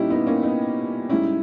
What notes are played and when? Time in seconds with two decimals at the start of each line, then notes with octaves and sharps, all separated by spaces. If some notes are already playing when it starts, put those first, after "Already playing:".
Already playing: A#2 G3 C#4 D#4 E4 G4
0.10 B3 D#4
0.27 A#3 C#4
0.43 B3 D#4
1.10 G#2 G3 C#4 E4